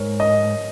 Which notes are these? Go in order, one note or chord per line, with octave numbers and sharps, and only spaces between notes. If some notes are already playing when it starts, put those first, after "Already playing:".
Already playing: G#2 A#4 C#5
D#5